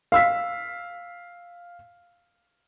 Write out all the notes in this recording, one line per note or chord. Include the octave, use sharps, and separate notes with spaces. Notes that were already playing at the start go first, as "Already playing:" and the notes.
F5 E6 B6